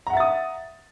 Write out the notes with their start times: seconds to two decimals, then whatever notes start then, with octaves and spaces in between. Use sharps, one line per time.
0.07 A#5
0.10 F#5
0.13 E5
0.17 A6
0.20 D#6